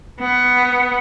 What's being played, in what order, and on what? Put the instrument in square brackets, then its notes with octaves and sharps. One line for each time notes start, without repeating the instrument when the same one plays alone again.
[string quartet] B3